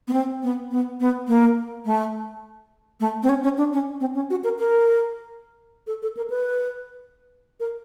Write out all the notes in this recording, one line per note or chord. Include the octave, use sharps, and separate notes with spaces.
B3
C4
B3
B3
B3
A#3
A3
A3
C4
C#4
C#4
D4
C#4
C4
C#4
F#4
A#4
A#4
A4
A4
A#4
B4
A#4